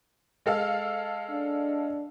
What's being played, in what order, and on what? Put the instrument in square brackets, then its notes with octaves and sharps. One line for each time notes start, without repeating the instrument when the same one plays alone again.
[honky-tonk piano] G#3 A4 F5
[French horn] D4